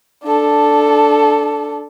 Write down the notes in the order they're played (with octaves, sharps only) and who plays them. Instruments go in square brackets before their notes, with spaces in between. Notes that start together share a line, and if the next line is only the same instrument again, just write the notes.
[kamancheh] D4 A4